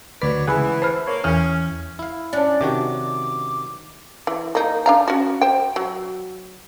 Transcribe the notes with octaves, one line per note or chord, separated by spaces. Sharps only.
D2 F#3 B4 C#5 D5 B5
C#2 E3 G#4 F#5 G#5 B5 F#6
C5 A5 B5 F6
A#3 C#5
E2 E3 C#4 F6
E4 F5
C#4 D4 D5
C3 D#3 F#4 D6
E3
A#3 D#4
D4 F5 A#5
C#4 F#4
C5 G5
F#3